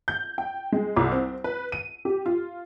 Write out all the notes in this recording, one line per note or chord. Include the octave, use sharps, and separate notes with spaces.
G6
G5
G#3
C2
C4
B4
D#7
G4
F4